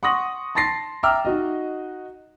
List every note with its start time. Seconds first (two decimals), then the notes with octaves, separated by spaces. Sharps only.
0.03 F#5 C6 C#6 D#6 A#6 F#7
0.55 A5 C6 A6 A#6 C7
1.03 E5 G5 A#5 D6 E6 F6
1.25 D#4 F#4 D#5